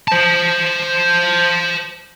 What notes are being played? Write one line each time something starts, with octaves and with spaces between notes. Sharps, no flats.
C5 A5